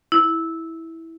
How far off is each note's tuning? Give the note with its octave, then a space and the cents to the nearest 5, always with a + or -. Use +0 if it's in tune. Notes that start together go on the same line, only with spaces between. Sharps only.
E4 -10